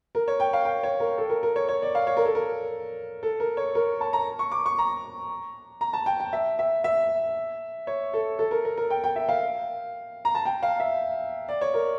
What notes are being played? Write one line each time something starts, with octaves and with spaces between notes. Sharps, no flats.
A#4
C#5
G5
F5
G5
C#5
A#4
A4
A#4
A#4
C#5
C#5
D5
F5
C#5
A#4
A4
A#4
A4
A#4
C#5
A#4
A5
A#5
C#6
D6
C#6
A#5
A#5
A5
G5
G5
E5
E5
E5
C#5
A4
A4
A#4
A#4
A#4
G5
G5
E5
F5
A#5
A5
G5
F5
E5
D5
C#5
A#4